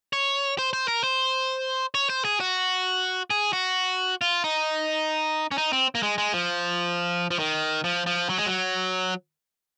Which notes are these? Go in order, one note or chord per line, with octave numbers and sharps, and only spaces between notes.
C#5
C5
C5
A#4
C5
C#5
C5
G#4
F#4
G#4
F#4
F4
D#4
C#4
D#4
C4
A#3
G#3
G#3
F3
F3
D#3
F3
F3
F#3
G#3
F#3